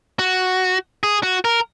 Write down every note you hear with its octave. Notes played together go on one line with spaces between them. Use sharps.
F#4
G#4
F#4
A#4